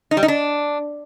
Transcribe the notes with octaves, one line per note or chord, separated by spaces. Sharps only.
D#4
G3
D#4
D4